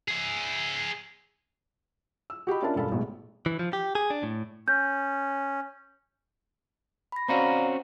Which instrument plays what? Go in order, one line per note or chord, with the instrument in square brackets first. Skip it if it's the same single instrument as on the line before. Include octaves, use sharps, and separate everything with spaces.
[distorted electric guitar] G#4 E5
[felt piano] E6
F#4 G4 D#5 B5
C#4 D4 F4 A#4 E5 A5
E1 G2 A4 F5 B5
A1 G#2 B2 G#3
[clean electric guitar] E3
F3
G4
G#4
D4
A2
[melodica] C#4 [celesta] G6
[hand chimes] B5 A#6
[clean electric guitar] C4 C#4 F#4 [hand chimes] D5 F5 A#5